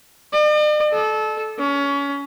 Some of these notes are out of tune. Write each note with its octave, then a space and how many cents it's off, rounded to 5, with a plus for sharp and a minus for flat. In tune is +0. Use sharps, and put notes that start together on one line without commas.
D5 +45
A4 -25
C#4 +25